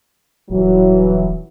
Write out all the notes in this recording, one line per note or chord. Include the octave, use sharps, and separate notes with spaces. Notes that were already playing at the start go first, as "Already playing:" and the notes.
D#1 E3 F#3